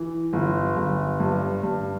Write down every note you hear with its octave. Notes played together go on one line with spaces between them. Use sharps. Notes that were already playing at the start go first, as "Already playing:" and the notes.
Already playing: E3
G1
G1
G2
G2